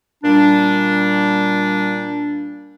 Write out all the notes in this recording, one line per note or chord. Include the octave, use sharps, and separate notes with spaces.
A#2 G3 D4